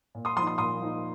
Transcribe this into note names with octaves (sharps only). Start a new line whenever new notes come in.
A#2
C6 D#6
F3 A#3 D#4 C6 D#6
C6 D#6
A#2 C6 D#6
F3 A#3 D#4